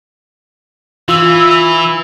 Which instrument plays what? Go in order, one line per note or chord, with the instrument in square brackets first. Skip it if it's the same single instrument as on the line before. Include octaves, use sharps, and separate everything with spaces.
[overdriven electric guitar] E3 [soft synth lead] F4 [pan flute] E6